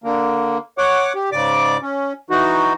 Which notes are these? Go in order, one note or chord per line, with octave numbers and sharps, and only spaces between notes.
D3 A#3
C#5 F#5 D6
G4
G#2 C#3 D5 D6
C#4
E3 D#4 F#4